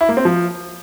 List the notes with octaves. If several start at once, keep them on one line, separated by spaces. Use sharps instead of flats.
E4
A#3
C4
F3